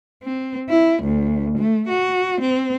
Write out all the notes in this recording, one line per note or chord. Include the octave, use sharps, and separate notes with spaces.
C4
E4
D2
A3
F#4
C4